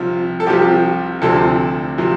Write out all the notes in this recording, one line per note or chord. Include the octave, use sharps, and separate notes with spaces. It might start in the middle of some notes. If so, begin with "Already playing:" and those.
Already playing: C2 C3 F3
A4
C2 C3 F3 G4
D2 C3 F3 A4
C3 F3